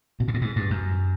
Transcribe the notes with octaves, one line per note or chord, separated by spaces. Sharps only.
B2
A#2
A2
G#2
G2
F#2